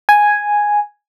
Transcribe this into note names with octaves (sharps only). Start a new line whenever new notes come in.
G#5